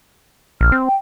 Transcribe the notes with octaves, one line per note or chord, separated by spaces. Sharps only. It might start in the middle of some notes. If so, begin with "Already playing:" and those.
A#1 F6
C4
G5